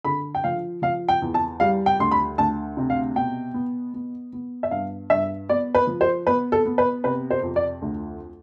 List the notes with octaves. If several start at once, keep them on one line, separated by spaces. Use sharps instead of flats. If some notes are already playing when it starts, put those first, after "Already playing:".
D3 B5
G5
F3 F5
F3 F5
G5
E2
A5
G3 F5
G5
D2 C6
B5
D2 A5
C3
F5
B2 G5
B3
B3
B3
E5
G2 F5
G2 E5
B3 D5
B4
F3
C5
B3 B4
A4
B3
B4
C3 B4
C5
F2
D5
D2